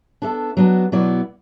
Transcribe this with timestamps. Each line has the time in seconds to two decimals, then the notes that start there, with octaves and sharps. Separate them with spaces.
0.22 B3 D4 A4 E5
0.57 F#3 B3 D4 F#4
0.92 B2 F#3 B3 E4 D5